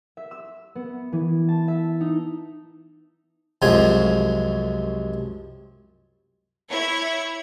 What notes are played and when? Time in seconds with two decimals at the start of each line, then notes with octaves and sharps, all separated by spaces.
0.17 E5
0.31 E6
0.75 B3
1.12 E3
1.48 A5
1.68 E5
2.01 D#4
3.62 C2 F#2 F3 G#3 F4 G#5
6.70 E4 C#5 G#6